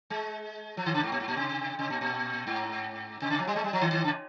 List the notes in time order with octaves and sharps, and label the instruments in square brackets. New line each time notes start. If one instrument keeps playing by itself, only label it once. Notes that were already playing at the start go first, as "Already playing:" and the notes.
[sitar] G#3
F3
D#3
C#3
G#2
A#2
G#2
A#2
C3
C3
A#2
A#2
G#2
C3
C#3
F3
G3
G#3
G3
F3
D#3
D#3
C#3